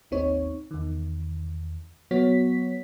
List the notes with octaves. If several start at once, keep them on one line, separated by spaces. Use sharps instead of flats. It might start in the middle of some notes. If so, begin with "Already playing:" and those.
G#1 D#2 C4 D#4 C#5
E2 D#3
F#3 B3 F#4 C#5 B6